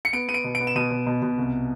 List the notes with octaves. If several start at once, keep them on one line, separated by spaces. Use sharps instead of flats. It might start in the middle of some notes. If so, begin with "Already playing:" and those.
C#7
B3 D7
B3 D#7
D7
B2
D7
B3
E7
B2 D#7
B2
B2
B2
C2